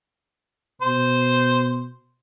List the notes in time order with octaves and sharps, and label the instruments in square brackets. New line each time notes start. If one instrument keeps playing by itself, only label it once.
[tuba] B2 [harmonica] C5